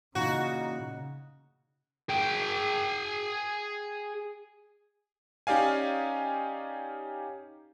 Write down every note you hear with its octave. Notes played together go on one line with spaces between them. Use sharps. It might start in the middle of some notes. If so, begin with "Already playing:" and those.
A#2 C#3 E3 D#4 F#4 A#5
G#4 G5
C#4 D#4 G4 D5 F5 G#5